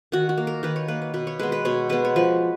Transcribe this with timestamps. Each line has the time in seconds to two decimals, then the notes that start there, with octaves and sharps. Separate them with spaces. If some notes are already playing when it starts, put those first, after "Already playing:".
0.12 D#3 F#4
0.29 F#4
0.37 A#3
0.47 A#4
0.63 D#3 B4
0.76 C#5
0.88 A#3 B4
1.02 B4
1.14 B2 B4
1.27 C#5
1.39 G#3 B3 B4
1.52 B4
1.65 B2 C#5
1.89 G#3 B3 B4
2.05 C#5
2.16 F3 B4